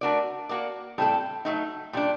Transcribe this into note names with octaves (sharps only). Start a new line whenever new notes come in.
A3 D4 F#4 A#4 D5
A#3 F#4 A#4 D5
A2 G3 C4 D#4 A4
F#3 A3 D#4
A#2 G3 D4